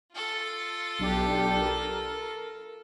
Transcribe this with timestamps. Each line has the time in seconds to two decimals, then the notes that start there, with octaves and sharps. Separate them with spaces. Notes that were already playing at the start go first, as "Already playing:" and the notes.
0.13 F4 A4
0.99 B1 D4 G4
1.60 A#4